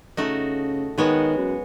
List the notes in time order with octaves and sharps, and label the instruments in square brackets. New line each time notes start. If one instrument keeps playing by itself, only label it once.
[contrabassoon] C#3 [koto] A3 D#4 F#4
[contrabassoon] D#3 [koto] G#3 B3 F#4 C#5
[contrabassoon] F#2